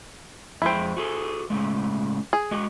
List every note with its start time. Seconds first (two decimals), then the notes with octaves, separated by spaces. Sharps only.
0.62 F2 G#3 E4 C5 G5
0.97 F#4 G#4 A4
1.50 A2 C#3 G#3
2.33 G#4
2.51 G#3 F#4 D#5